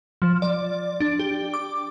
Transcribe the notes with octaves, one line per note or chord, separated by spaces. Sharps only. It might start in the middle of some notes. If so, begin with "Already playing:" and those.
F3
D5
D4
G4
D6